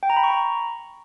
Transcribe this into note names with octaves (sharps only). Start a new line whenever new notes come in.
G5
A#5
B5
C#6
A#5